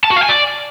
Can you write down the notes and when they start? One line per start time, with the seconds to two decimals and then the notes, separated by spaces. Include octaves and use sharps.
0.04 A5
0.11 F#4
0.17 F5
0.23 G#5
0.29 D5